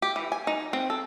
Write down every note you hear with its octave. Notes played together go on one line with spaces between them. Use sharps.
G4
E3
G#5
D#4
C4
A4